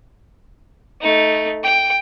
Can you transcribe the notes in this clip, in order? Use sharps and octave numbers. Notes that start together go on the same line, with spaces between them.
A3 D#4
G5